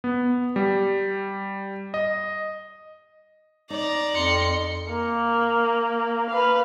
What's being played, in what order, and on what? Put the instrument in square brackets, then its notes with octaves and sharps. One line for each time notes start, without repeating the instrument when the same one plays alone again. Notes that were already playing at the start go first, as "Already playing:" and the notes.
[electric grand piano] B3
G3
D#5
[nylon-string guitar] D#4 [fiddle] D5 A#5
[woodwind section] F2 [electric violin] C6 C#7
[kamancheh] A#3
B4 F5